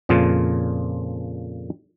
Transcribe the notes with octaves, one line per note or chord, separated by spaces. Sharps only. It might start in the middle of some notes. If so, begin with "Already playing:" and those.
F2 A#2 C#3 F3 F4